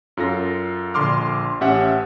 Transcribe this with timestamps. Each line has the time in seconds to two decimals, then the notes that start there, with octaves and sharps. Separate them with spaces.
0.17 F#2 F4 A4 A#6
0.94 A#1 D3 C6 D6 F6
1.61 A1 C#4 G4 E5 F#5